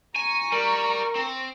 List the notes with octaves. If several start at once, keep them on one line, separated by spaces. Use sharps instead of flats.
G#5 A#5 C#6
G3 A#4
C4